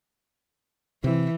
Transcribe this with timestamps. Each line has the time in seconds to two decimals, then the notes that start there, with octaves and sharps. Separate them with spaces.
1.04 C3 E3